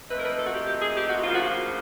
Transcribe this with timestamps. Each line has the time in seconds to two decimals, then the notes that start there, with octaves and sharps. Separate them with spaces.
0.10 A#2 F3 A3 C4 D#4 B4
0.18 A#4
0.24 B4
0.38 A4
0.45 F#4
0.52 G4
0.66 G4
0.81 G#4
0.95 G4
1.09 F#4
1.23 D2 C#3 F3 A#3 F4
1.32 F#4
1.42 F4